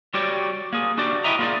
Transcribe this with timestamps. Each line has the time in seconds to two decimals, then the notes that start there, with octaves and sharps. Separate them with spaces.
0.14 G3 F#4 G4 C#5 D5
0.73 A#3 G#4
0.98 D4 F#4 G4 D5
1.24 E4 F#4 G4 D#5 E5 A#5
1.39 A#3 F4 G#4 D5